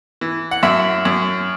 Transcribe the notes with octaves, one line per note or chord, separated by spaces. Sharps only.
E3
F#5
F#2 E5
F#2